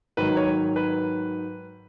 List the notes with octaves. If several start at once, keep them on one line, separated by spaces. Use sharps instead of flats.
G#2 D#3 F#3 B4
C#5
B4